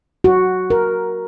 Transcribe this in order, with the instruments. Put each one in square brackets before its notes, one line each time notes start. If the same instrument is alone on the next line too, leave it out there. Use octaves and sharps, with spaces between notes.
[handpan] F#4
A#4